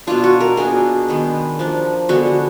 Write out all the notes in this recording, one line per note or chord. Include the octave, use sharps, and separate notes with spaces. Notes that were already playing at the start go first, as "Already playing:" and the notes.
B2 A#3 D4 F4
F#4
A#4
B2 A#3 D4 G#4
D#3 G#3 B3 D4
F3 A#3 D4
D3 G#3 B3 D4 F#4